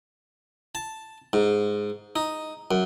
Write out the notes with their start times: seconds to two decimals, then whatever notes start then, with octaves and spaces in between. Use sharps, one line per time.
0.75 A5
1.33 G#2
2.16 D#4
2.71 F#2